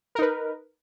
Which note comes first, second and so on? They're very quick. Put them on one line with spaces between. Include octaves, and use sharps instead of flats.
A#4 D#4 B4